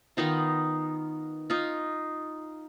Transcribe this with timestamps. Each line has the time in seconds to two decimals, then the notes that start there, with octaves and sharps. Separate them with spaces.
0.17 D#3 B3 D#4 F4
1.50 D#4 F4